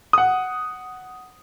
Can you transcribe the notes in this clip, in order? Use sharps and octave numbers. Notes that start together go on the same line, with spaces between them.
F#5 D#6